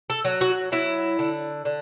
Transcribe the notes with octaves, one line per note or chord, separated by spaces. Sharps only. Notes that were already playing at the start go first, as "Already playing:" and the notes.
A4
F#3
F#4
F#3 E4
D3
D3